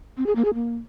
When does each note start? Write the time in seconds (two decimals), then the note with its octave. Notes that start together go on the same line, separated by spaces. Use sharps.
0.17 C4
0.26 G#4
0.35 A#3
0.45 G#4
0.54 A#3